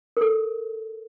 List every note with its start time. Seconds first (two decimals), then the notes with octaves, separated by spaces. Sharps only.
0.17 A#4
0.21 A4